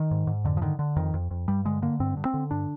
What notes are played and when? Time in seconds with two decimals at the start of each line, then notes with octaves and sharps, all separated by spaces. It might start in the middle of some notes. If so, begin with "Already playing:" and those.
Already playing: D#3
0.11 G#2
0.27 G#2
0.44 F2 D3
0.57 F3
0.62 D3 D#3
0.79 D3
0.96 F2 D#3
1.14 F2
1.31 F2
1.48 G2 G3
1.65 D3 G#3
1.82 D3 A#3
2.00 G2 C4
2.17 G2
2.25 C4
2.34 D3
2.51 G2 D4